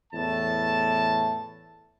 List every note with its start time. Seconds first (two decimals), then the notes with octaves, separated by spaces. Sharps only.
0.13 E2 A2 A5